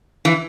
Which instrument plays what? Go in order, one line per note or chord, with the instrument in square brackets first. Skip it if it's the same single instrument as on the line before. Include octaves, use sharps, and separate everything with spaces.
[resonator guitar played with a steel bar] E3